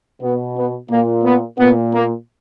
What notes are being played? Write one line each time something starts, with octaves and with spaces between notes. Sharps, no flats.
B2 B3
B3
A#2 A#3
B3
A#2 B3
A#3